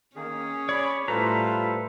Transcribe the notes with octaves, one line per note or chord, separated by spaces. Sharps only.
D#3 A#3 C#4 G#4
C#5 D5 B5
A2 G3 F4 A4 B4 C5 A#5